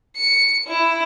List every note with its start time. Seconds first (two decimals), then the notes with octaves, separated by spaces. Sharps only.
0.16 C#7
0.67 E4